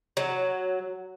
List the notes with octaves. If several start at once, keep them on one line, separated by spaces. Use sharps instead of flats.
F#3